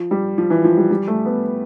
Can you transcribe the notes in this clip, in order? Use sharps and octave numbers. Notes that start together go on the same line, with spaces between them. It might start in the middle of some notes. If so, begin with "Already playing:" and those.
Already playing: F3
G3
F3
E3
F3
G3
G3
A3
B3